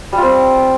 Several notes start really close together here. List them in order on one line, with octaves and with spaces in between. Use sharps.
G3 F4 C4